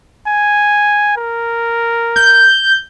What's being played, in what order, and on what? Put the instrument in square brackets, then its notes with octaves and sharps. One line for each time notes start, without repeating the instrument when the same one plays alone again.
[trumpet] G#5
A#4
[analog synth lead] G6